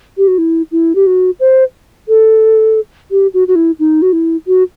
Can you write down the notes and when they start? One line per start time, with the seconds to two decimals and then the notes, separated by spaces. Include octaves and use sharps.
0.17 G4
0.28 F#4
0.38 E4
0.72 E4
0.95 G4
1.07 F#4
1.40 C5
2.08 A4
3.11 G4
3.34 F#4
3.48 F#4
3.55 E4
3.79 D#4
4.02 F#4
4.13 E4
4.47 F#4